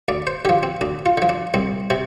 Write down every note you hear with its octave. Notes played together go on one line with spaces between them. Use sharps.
D2 D5
C5
D3 F3 G4
C4
D2 D4
F4
D3 F3
D4
C2 C4
C3 C4